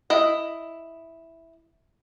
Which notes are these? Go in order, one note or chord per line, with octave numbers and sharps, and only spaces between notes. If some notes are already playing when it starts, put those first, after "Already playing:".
E4 D#5